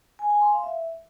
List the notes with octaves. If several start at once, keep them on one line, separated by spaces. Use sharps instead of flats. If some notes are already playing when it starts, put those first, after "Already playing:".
G#5
G#5
C6
F5
E5